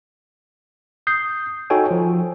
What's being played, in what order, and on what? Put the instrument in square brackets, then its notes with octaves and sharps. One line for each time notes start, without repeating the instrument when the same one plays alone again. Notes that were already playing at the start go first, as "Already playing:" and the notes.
[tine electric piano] D#6 G6 C7
D#4 F#4 A4 C#5 G5 G#5
F3